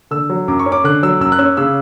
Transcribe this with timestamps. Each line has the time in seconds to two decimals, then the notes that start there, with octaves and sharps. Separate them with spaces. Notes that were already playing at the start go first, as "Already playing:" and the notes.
0.11 D3 E6
0.30 F#3
0.48 F#2 D6
0.59 C#6
0.66 C#4
0.72 D6
0.84 D3 F#6
1.03 F#3 E6
1.20 F#2 E6
1.32 F#6
1.39 C#4 E6
1.57 C#3 E6